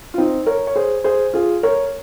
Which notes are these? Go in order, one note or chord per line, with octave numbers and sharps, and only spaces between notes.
F4
C4 D#4
A#4 C#5
C#5
G#4 C5
G#4 C5
F4 G#4
A#4 C#5